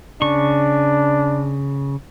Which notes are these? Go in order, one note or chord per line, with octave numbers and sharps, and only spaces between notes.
C#3 D4 C#6